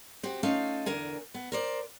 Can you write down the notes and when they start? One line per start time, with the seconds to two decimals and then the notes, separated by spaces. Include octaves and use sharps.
0.23 C4 F#4 G4
0.43 A3 C#4 D#4 F4 A4 F5
0.86 E2 D3 A#4 G#5
1.34 B3
1.52 A#4 C5 D5